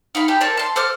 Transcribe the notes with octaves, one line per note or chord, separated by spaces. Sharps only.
D#4 F5 B5
G4 A4 G5
A4 A#4 C5 D5
A5 C6
A4 C5 D6 F6